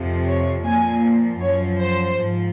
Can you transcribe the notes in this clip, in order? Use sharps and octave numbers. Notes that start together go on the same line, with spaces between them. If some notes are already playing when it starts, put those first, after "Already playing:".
Already playing: F2 C3 F3
C#5
A#2 F3 G#5
F#2 F3 C#5
C5
G#2 F3